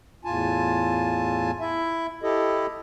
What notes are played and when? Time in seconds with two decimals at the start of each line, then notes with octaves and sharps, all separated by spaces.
0.25 E2 A2 F4 G#5 A5
1.60 E4 E5
2.23 E4 G4 A4 D#5